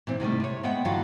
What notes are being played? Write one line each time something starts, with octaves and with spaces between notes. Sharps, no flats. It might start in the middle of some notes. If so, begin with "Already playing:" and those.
A#2 E3 C4
C3 D#3 G3 A3
C3 C#5
G#3 B3 E5 F#5 G5
G2 D3 E3 F#3 F4